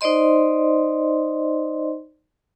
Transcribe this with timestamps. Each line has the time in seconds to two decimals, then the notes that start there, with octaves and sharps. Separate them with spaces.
0.01 D#4 C5 D5 D#5 C6